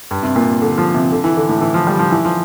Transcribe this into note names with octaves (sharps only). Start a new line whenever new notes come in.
G2
C3
A#2
D3
F3
C3
D3
E3
D3
A2
E3
F3
G3
F3
E3
F3